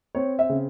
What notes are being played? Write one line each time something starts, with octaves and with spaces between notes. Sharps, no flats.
C4 C#5
E5
C#3